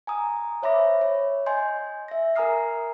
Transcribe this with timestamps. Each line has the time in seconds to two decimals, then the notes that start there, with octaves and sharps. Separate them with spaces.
0.07 G#5 A#5 D#6
0.62 C5 C#5 E5 B5 D6 A#6
1.01 C#5
1.46 D#5 G#5 C6 G6
2.08 E5 A#6
2.36 A#4 G#5 A#5 D#6 F6 C7